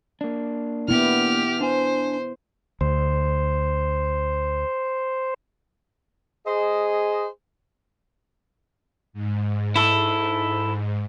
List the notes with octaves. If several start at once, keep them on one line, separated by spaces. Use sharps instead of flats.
A#3 D4
B3 E4 G4 F6
D4 C5 G#5
D2 C5
G#4 C5 D#5
G#2
E4 A4